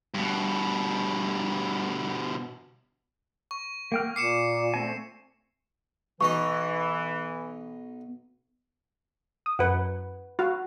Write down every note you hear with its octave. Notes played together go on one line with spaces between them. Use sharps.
G2 B2
C#6
A#3 G5 F6
A#2 D6 C7 C#7 E7
A3 C4 G#5
B1 E3 D#4 D#5 C#6
D#6
F#2 B4 F#5
F#4 F5